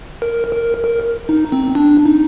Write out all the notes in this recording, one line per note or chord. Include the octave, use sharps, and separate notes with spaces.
A#4
A#4
A#4
D#4
C4
D4
D#4